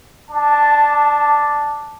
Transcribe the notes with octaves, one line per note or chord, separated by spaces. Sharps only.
D4 A5